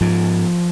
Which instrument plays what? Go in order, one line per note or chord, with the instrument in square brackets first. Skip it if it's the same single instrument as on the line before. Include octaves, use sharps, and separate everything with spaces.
[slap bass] G#2 F3